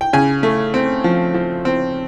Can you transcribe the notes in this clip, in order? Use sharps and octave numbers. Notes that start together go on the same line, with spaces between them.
G5
C#3 G#5
A3
C4
F3
F3
C4